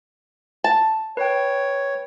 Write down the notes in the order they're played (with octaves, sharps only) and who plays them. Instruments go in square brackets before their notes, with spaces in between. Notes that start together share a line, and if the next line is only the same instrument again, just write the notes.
[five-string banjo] A5
[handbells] B4 G5 [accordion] C#5